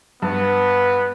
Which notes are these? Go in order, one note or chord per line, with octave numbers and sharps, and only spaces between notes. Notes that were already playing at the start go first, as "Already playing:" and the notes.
G2 B3